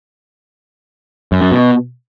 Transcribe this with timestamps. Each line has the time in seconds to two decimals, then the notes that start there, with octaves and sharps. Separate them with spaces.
1.32 F#2
1.42 F#2
1.52 B2